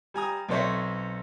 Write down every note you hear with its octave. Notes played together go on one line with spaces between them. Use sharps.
G3 G#5 A#5 D#6
B1 C4 A4 C5 C#5 E5